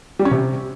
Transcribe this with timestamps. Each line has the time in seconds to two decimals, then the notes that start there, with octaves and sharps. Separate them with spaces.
0.19 G3
0.25 C#4
0.31 C3